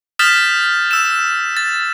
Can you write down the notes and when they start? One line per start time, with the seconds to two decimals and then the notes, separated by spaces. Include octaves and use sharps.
0.19 D#6 F6 G6 A6 B6 E7
0.91 E6 E7
1.57 A6